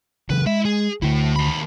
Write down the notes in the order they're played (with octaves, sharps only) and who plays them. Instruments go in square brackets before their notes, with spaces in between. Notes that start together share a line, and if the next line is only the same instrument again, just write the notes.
[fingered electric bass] C#3 E3 F#3 [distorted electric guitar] B4
[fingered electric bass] G#3 [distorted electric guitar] E4 E5
[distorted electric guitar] G#4
[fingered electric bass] D2 D3 [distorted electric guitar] A3 E4
[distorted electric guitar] D#2 B5